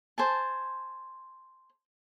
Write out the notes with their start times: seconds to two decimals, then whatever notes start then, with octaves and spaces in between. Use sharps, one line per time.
0.18 C5 G#5 A5